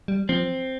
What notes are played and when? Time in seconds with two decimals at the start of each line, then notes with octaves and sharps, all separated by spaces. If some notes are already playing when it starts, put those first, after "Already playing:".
0.08 G3
0.29 F3 C4